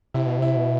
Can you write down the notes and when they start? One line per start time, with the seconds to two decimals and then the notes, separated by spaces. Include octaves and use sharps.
0.14 C3 E4
0.27 B2
0.39 C3 E4
0.56 B2